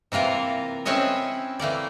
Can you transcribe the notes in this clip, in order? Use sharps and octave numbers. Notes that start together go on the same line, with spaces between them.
C3 E3 A#3 F4 A#4
C4 C#4 E4 B4 C#5 D#5
E3 A3 A#3 D5